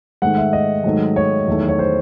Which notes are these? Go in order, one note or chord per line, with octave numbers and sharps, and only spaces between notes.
G#2 D#3 A3 F#5
E5
D#5
G#2 D#3 F#3 A3
C#5
E2 D#3 F#3 A3
C#5
C5